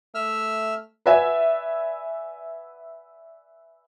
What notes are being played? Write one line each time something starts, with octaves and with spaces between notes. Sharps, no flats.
A3 E5 E6 F6
B4 D5 E5 F#5 G#5